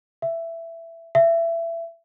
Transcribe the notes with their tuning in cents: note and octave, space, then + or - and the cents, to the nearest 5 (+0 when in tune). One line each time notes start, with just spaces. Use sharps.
E5 +15
E5 +25